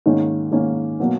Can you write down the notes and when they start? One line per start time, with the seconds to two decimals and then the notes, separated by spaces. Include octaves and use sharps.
0.06 G#2 D#3 A#3 C#4
0.52 G#2 D#3 A#3 C#4
1.00 B2 F#3 A#3